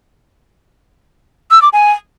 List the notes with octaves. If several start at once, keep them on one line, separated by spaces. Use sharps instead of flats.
E6
D6
G#5